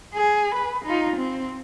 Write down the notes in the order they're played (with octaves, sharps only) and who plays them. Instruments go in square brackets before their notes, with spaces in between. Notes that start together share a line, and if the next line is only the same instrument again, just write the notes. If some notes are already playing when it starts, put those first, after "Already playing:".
[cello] G#4
B4
D#4 F4
C4